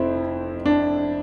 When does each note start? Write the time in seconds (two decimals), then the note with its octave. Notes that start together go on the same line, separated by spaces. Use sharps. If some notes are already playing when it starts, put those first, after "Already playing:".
Already playing: F1 F2 C4 E4
0.66 D4